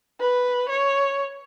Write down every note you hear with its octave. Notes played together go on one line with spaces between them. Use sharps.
B4
C#5